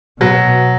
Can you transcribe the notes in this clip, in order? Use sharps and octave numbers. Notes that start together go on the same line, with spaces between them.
B2 F#3